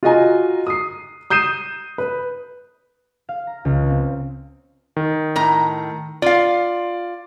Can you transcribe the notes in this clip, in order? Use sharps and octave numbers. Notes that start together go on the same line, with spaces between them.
F4 F#4 G#4 D#5 G#5 A#5
D#6 C7
D#6 G6 C7 D#7 E7
B4
F5
A#5
C#2
C4
D#3
A2 A#5
F4 D5 F5